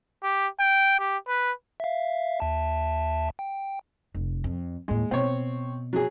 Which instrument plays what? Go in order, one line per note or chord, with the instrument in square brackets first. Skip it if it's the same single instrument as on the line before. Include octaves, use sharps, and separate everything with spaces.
[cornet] G4
G5
G4
B4
[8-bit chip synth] E5 F5
D#2 E5 A5
G5
[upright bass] F1
F2
[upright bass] D#2 A2 [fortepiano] G#3
[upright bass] B2 [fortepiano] C4 C#5
[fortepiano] F#3 G#4